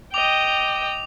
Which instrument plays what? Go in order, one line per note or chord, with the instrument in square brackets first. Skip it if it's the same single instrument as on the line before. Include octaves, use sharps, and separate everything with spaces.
[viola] D#5 G5 [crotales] D6 F7